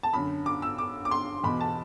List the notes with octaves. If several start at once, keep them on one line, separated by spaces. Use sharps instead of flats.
A5
F#2 D3 B5
D6
E6
D6
D6
C6
E2 B2 B5
A5